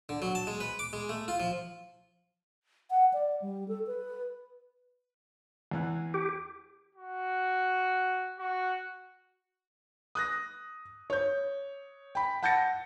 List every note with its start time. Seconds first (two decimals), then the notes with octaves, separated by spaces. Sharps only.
0.09 D3
0.22 F#3
0.35 A5
0.47 G#3
0.60 B4
0.79 D6
0.93 G#3
1.09 A3
1.28 F4
1.40 F3
2.90 F#5
3.13 D5
3.42 G3
3.68 A4
3.87 B4
5.71 E2 E3 F#6
6.14 G4
6.95 F#4
8.39 F#4
10.15 D#6 F#6 A#6
11.10 C#5 G6
12.15 G5 B5
12.43 F#5 A5 G6 A6 A#6 C#7